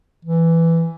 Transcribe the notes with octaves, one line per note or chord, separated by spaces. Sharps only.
E3